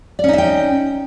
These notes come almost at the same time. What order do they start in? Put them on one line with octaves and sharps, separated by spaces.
D5 C#4 D#4 E5 G5